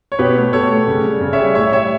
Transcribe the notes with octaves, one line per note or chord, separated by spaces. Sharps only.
C#5
B2 G4 B4
A3
B2 A4 C#5
A3
C#3
G3
C#3
C#5 E5
G3
A2 C#5 E5
G3 C#5 E5